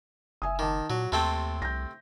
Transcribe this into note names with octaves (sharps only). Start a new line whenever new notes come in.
F#1 E5 G#5 D#6
D#3 A5 D6
A#2 F#3
D#2 C3 A3 C4 A5 C6
C2 G6 A#6